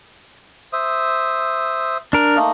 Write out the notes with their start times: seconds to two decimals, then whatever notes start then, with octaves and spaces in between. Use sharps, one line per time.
0.73 C5 E5 D#6
2.13 D4 A#4
2.36 A3 A#3 D#4